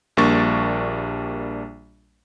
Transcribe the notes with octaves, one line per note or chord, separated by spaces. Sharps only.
A#1 G3 A#3 D4 C#6 A6